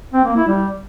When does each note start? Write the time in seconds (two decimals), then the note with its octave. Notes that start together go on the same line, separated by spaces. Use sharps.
0.13 C4
0.25 A#3
0.36 E4
0.47 G3